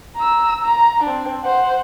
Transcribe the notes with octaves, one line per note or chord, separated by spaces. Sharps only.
A#5 E6
A#5
C4 D4
C5 F#5